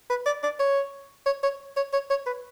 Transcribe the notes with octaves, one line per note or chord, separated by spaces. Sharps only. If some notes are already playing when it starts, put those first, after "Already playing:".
B4
D5
D5
C#5
C#5
C#5
C#5
C#5
C#5
B4